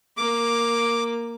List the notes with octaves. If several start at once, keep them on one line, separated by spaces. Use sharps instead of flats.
A#3 D6